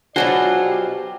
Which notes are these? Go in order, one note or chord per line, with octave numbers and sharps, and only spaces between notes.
B2 F#3 F4 F#4 G#4 C5 D5 A5
G4